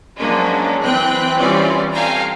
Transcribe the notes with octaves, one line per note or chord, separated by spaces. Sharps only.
F3 F#3 G#3 A#3 C#4 D4
E3 C4 B4 G5 F#6
E3 G3 C4 C#4 F4 D5
A4 F5 G5 G#5 A#5